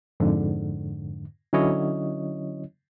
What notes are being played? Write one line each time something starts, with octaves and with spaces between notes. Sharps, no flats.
F2 G#2 D3
D3 F#3 C#4 E4 C#5 D#5